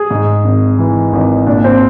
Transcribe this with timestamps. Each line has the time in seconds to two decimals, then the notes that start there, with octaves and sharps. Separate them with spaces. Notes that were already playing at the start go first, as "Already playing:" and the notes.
Already playing: G#4
0.11 G#2
0.44 G#1
0.78 E3
1.13 G#1
1.47 A#2 D4
1.64 C4